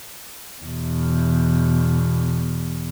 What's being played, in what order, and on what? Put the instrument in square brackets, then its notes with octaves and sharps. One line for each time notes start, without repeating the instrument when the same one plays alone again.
[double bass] E2 B2